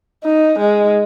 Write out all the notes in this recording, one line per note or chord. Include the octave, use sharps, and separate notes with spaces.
D#4
G#3